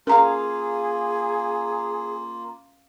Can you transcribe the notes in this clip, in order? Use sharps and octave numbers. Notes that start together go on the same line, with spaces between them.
A#3 C#4 F4 G#4 A#4 F5 A#5